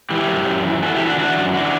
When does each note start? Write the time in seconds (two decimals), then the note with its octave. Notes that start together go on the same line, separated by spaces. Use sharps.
0.10 E3 E4 G4
0.28 F#2
0.46 F#2
0.65 E3
0.82 E3 F#4 A4
0.94 E4 G4
1.01 E3
1.06 D4 F#4
1.18 E3 D4 F#4
1.36 F#2
1.54 E3 D4 F#4